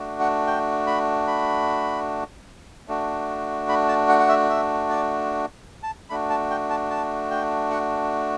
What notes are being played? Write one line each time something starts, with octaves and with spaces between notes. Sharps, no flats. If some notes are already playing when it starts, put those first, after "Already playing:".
Already playing: A3 D4 F#4
F#5
G5
B5
B5
A3 D4 F#4
B5
A5
F#5
F#5
E5
E5
D5
A5
A3 D4 F#4 B5
A5
G5
A5
A5
G5
F#5